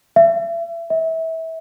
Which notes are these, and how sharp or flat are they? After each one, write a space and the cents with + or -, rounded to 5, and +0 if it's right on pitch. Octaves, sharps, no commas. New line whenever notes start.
E5 +35
E5 -25